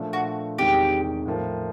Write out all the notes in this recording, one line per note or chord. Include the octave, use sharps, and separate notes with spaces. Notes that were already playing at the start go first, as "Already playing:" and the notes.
Already playing: A#2 F3 A3 D4
F#4
E2 C3 D#3 G#3 G4
A2 F3 A#3